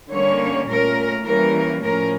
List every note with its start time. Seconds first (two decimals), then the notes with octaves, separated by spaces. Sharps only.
0.10 D3 G3 A#3 C#4 C#5
0.68 A#2 A3 C#4 A#4
1.26 E3 G3 A#3 C#4 A#4
1.83 A2 F3 C#4 A#4